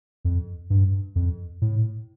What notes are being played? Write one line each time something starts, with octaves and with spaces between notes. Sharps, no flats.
F2
G2
F2
A2